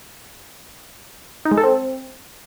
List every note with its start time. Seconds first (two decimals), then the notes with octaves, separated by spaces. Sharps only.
1.45 D#4
1.51 G#3
1.57 A4
1.64 C4